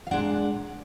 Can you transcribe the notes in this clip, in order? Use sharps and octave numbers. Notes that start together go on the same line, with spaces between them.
F5
A#2 G#3 D4 F#5